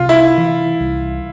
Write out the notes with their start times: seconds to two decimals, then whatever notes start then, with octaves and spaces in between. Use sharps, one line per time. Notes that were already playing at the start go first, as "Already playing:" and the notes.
Already playing: C2 C3 F4
0.09 E4
0.38 E3
0.80 C2